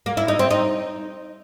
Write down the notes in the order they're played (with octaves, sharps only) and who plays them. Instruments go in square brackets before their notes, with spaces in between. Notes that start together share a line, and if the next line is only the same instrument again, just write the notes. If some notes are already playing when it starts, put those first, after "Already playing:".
[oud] A#3
E4
D#4
C4
D#4